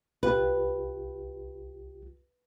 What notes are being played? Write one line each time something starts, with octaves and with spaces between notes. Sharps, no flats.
C2 F4 G4 B4